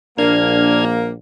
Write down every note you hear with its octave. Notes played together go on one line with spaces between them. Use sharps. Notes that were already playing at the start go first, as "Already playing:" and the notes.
A#1 A#3 D4 F6 G#6